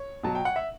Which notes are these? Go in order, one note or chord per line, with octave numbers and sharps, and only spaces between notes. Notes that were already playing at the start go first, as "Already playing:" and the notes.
Already playing: C#5
B2 F#3 A5
G5
F#5
E5